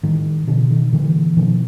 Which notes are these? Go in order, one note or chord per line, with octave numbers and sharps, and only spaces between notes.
A2 D#3
B2 D3
D#3
A#2 D3 E3
B2 D#3 F3